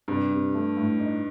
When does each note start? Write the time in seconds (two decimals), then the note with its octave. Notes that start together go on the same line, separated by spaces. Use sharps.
0.08 G2 C3
0.31 C3
0.54 A3
0.77 A2
0.99 D#4